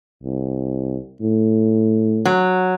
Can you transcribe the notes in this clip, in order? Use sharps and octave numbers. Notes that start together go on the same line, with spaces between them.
C2
A2
F#3